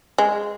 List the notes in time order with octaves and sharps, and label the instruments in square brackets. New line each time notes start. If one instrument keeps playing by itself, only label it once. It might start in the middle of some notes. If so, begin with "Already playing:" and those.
[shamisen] G#3